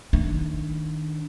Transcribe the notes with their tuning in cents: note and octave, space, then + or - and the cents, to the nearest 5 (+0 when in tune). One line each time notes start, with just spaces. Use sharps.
D#3 +0 D4 +0